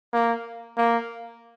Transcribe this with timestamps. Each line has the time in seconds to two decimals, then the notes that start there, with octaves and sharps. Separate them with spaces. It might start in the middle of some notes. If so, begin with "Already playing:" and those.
0.13 A#3
0.77 A#3